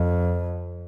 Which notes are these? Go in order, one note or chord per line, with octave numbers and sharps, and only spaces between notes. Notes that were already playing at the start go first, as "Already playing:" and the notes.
Already playing: F2